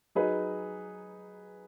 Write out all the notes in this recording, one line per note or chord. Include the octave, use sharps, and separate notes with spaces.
F#3 D#4 G#4 B4